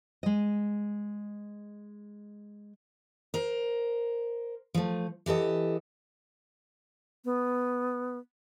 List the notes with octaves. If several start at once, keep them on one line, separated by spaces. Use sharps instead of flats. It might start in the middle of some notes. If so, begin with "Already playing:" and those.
G#3 D#5
A#4 C5
F3 A3
E3 G4 A4 D#5
B3